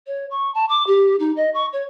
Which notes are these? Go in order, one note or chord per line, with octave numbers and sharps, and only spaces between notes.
C#5
C#6
A5
D6
G4
D#4
D#5
C#6
C#5